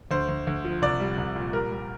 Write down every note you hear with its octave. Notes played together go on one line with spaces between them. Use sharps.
D2 C5
D2
D2
F3
C2 D5
G3
C2
A#2
G3 A#4
G3